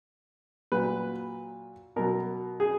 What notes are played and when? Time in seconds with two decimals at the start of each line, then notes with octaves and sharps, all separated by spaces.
0.72 A#2 F#3 B4
1.96 B2 F#3 A#4
2.60 G#4